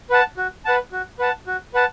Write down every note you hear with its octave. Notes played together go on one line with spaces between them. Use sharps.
B4 F#5 A5
F#4
B4 F#5 A5
F#4
B4 F#5 A5
F#4
B4 F#5 A5